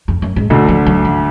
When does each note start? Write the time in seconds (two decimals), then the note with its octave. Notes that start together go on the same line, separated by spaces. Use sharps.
0.08 F2
0.22 F#2
0.36 G#2
0.50 D2 A#2 D3
0.68 F3
0.86 F#3
1.05 F3